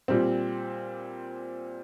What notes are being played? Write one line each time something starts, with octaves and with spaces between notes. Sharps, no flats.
A#2 G3 C4